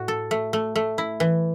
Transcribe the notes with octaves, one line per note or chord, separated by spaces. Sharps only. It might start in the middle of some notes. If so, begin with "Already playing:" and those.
Already playing: A2 F#4
A4
A3
A3
A3
E4
E3